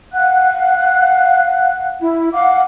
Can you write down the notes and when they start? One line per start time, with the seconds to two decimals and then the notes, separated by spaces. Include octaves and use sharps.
0.13 F5 F#5 F#6
2.00 E4
2.33 F5 F#5 D6